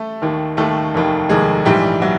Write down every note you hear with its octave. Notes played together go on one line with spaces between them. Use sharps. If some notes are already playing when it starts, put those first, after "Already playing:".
Already playing: A3 A4
D#2 D#3
D#2 D#3 A3 A4
F1 D#2 D#3
F1 D#2 D#3 G#3 G#4
A#1 G#2 E3 G3 G4
E3 F#3 F#4